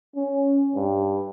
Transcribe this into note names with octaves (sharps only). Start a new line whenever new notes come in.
C#4
G2